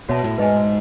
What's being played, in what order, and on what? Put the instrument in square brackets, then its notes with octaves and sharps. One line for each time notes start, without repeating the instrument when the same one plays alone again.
[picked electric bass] B2 [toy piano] F#4 C#5 E5 A5
[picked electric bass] A2
[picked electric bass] G#2 [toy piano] B4 D#5 G#5